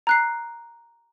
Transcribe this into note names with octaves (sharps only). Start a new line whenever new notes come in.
A#5 F#6 C7